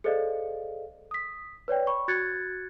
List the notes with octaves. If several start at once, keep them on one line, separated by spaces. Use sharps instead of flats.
G#4 A4 C5 D5 D#5 F5
D#6 B6
B4 C#5 D5 G5
B5 C#6
F#4 F#6 G#6 A6 C#7